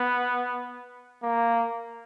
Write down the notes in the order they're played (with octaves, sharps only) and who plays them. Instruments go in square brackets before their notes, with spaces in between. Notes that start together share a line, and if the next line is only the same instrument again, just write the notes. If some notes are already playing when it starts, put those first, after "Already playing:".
Already playing: [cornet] B3
A#3